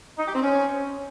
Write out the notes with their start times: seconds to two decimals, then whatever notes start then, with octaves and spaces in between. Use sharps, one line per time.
0.18 D#4
0.26 G4
0.34 C4
0.42 C#4